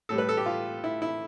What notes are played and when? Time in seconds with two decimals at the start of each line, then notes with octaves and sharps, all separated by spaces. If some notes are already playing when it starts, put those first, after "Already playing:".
0.09 A2 G3 A4
0.18 B4
0.29 A4
0.37 G4
0.46 F4
0.84 E4
1.02 E4